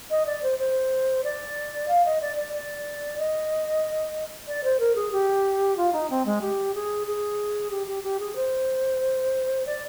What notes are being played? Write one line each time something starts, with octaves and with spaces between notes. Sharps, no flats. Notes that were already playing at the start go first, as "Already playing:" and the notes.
D#5
D5
C5
C5
D5
F5
D#5
D5
D5
D5
D#5
D5
C5
A#4
G#4
G4
F4
D#4
C4
G#3
G4
G#4
G#4
G4
G4
G4
G#4
C5
D5